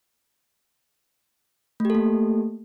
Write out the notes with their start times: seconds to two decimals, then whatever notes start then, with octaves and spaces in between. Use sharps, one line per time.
1.80 A3
1.85 G4
1.90 A4
1.95 A#3